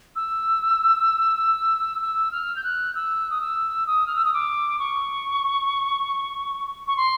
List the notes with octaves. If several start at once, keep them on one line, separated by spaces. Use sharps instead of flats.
E6
E6
F6
G6
F#6
E6
D#6
E6
D#6
F6
E6
D#6
D6
C#6
C#6
C6